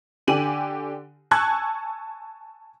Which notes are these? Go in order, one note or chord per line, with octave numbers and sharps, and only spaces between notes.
D3 G4 G#5 D#7 F#7
G#5 A5 C#6 E6 F#6 G#6